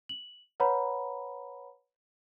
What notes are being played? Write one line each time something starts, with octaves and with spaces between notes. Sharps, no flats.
F#7
B4 C#5 F#5 A#5 B5